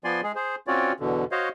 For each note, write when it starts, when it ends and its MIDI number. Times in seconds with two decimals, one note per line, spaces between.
0.04 0.21 53
0.04 0.21 59
0.04 0.21 74
0.04 0.21 80
0.04 0.21 84
0.23 0.32 56
0.23 0.32 68
0.35 0.55 68
0.35 0.55 72
0.67 0.92 60
0.67 0.92 61
0.67 0.92 65
0.67 0.92 66
0.67 0.92 73
0.67 0.92 74
1.00 1.24 40
1.00 1.24 47
1.00 1.24 50
1.32 1.49 66
1.32 1.49 72
1.32 1.49 73
1.32 1.49 75
1.32 1.49 77